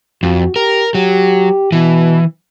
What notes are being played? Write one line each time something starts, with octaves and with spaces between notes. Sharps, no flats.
F2 F#4
G4 A#4
F#3 G4
B2 E3